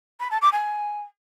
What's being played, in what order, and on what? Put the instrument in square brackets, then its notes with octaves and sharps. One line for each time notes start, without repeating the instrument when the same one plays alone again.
[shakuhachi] B5
A5
D6
G#5